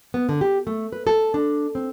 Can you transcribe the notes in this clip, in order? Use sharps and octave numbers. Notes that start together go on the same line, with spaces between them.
B3
D3
G4
A3
B4
A4
D4
C4